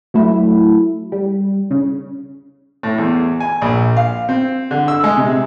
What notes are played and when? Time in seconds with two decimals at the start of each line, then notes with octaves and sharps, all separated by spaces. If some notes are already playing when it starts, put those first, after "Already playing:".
0.14 F#3 A3 E4
1.12 G3
1.71 C#3
2.83 A2
2.98 E2
3.40 G#5
3.62 A#1
3.97 F5
4.29 C4
4.71 D3
4.88 E6
5.04 G#3
5.17 C3